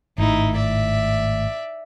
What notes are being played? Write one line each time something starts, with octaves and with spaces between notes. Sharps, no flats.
G#1 A2 D#4 E4
D5 E5